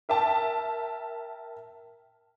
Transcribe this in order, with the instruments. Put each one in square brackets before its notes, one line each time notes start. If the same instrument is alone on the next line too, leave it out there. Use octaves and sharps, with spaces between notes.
[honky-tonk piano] A#4 E5 G5 A5